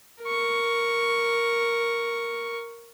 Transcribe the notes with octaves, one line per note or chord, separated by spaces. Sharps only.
A#4 C#6